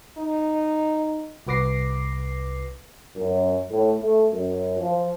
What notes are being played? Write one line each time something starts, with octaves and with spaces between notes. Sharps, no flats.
D#4
C2 F#4 B4 D6 A#6 C7
F#2
A2
A3
F#2
F3